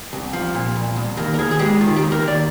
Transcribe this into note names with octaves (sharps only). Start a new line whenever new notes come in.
C2
F3
A#2
C2
C2
D#2 A#4
A#4
D#2 G#4
G#4
G#3 G4
D#3 F4
G4
D#2
A#4
D#2
D5